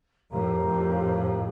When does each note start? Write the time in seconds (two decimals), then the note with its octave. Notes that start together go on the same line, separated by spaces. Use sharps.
0.31 F2 A2 G4 A#4 F5 A#5
0.66 F2 A2